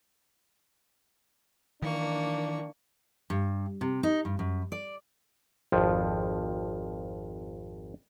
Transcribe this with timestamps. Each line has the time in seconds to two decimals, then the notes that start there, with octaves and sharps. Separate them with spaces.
1.82 D#3 E3 A#3 D4 C#6
3.30 G2
3.81 C3
4.03 D#4
4.25 G2
4.39 F#2
4.72 D5
5.72 G#1 F2 F3